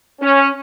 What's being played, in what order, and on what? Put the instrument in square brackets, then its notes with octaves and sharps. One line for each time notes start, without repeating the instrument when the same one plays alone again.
[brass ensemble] C#4